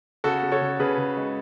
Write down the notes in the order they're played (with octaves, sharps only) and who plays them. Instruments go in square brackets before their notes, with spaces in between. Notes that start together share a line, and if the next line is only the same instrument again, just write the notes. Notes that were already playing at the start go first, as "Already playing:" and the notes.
[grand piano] C#3 F#4 A4
C#3
A4 C#5
C#3
C#3 G#4 B4
C#3
G#3